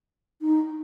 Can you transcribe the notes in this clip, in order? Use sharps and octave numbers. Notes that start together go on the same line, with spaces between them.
D#4